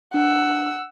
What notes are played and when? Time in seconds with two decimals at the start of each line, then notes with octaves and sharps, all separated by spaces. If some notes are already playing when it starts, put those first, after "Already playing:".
0.14 D4 F#5 E6